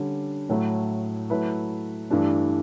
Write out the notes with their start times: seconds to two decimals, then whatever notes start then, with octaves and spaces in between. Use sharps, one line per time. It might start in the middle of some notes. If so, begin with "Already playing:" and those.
Already playing: D3 G3 C#4
0.49 A2 F#3 A3 E4
1.30 F#3 A3 E4 B4
2.10 G2 E3 A3 D4